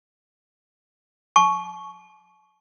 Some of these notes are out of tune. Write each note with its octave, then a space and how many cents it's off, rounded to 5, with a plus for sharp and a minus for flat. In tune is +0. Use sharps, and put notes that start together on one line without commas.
A5 -40 C#6 +0